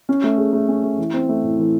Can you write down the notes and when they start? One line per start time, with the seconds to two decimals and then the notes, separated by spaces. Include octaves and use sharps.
0.09 C#4
0.24 A3
0.38 G#4
0.53 A3
0.68 C#4
0.84 A3
0.98 E3
1.14 C4
1.29 A3
1.44 A2
1.59 E3